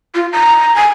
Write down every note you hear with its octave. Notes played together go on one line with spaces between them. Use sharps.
F4
A#5
G#5